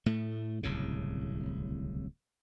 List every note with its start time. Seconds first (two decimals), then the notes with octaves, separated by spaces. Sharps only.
0.06 A2 A3
0.63 D1 C2 A2 C#3